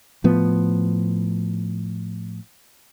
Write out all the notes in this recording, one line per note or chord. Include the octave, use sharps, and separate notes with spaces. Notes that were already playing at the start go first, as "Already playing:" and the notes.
A2 F3 B3